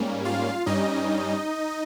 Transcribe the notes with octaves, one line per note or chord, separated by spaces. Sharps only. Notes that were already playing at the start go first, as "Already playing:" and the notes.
Already playing: G#2 G3 A#3 C#4
F4 F5
G2 G3 C#4 D#4 D#5